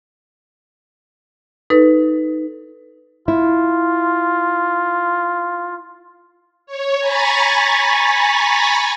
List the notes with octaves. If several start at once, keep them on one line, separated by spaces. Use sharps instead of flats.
D#4 A4 B4
E4 F4
C#5
G#5 A#5 B5 C#6 A6 B6